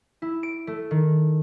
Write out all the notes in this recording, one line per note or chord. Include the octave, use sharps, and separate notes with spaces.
E4
D7
A3
D#3